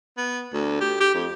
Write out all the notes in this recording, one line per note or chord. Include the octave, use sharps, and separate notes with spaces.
B3
D2
G4
G4
F2